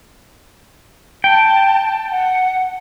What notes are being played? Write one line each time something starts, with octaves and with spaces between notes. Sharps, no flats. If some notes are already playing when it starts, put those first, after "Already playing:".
G5 A5
F#5